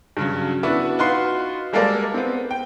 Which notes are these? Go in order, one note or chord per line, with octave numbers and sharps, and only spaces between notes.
G2 C#3 F#3
B3 D4 E4 F#4
D#4 F4 F#4 B4 C6 C7
G3 G#3 A#3 A4 A#4 D5
B3 C4
G5